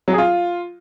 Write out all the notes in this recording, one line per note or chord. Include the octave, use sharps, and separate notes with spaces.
F#3
G#4
F4